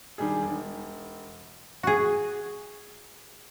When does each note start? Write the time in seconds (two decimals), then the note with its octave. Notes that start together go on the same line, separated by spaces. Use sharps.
0.18 D#3 G3 D4 G#4
0.42 E1
1.83 F#4 G#4